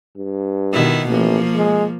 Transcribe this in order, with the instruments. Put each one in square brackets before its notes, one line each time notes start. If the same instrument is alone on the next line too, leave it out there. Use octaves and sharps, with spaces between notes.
[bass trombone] G2
[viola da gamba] B2 D#3 E4
[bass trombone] A1 [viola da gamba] F3 A#3
[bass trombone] G#3